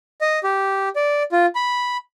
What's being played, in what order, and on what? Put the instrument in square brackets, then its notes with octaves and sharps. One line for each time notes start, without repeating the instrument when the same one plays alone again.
[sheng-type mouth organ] D#5
G4
D5
F4
B5